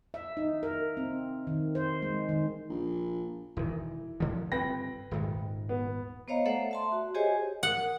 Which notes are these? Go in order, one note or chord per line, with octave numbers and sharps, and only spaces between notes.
E5
D#4
A#4
C4
D#3
C5
G#3
D#3
A#1
E1 D#3 E3
D3 F3
G1 C#3 C4 B4 G5 A#6
D#1 G#2 D#3
B3
B3 C5 C#5 D#5 F5 A#5
A3 A4 C5 D5 E5 F#5
E5 A5 C6
F#4
G4 G#4 C5 C#5 D#5 G#5
F#5